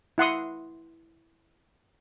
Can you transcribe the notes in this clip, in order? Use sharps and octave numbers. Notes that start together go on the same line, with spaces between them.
E4 F#5 C6 D#6